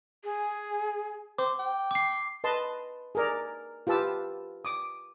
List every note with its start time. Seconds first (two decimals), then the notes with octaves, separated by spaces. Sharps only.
0.24 G#4
1.38 C5 D6
1.59 G5
1.91 D6 C7
2.44 B4 D#5 A5 C6
3.15 G#4 A#4 D5
3.87 F4 G4 B4 A5 E6
4.65 D6 D#6